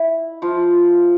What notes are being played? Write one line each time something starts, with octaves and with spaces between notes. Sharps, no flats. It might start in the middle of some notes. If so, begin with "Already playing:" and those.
Already playing: E4
F3 F4